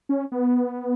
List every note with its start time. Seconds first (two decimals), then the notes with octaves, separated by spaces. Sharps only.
0.09 C#4
0.32 B3